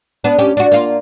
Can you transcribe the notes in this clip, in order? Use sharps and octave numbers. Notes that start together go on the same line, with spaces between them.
B3 D4
C#4 G4
D4 F#4
A#3 F4